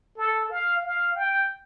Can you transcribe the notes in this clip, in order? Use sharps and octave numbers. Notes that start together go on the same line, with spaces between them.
A4
F5
F5
G5